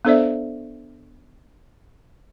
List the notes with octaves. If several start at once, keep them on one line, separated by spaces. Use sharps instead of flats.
B3 D4 A4 C5 D5 E5